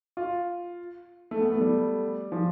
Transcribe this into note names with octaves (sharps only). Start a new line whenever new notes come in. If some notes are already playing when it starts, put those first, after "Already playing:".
F4
A3
B3
A3
G3
F3